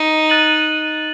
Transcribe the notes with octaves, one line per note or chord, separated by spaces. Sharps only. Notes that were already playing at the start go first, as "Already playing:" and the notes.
Already playing: D#4
F#6 A6 D#7 F#7